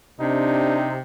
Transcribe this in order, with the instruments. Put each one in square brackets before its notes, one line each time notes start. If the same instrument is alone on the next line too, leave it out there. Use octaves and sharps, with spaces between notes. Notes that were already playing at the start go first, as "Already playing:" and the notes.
[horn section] C3 [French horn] D4 [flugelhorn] D#4